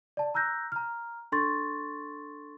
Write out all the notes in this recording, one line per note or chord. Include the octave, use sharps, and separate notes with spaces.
D5 A5
A#5 E6 F#6 G6 A#6
A#5 F6
D4 A4 C6 C#6 A6